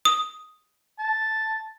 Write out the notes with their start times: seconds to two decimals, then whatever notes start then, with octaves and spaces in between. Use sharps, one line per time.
0.05 D#6
0.99 A5